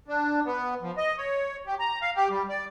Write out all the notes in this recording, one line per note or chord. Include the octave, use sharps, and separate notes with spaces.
D4
B3
F3
D#5
C#5
G4
A#5
F5
G4
G3
D5